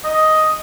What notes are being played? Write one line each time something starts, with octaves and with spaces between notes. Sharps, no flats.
D#5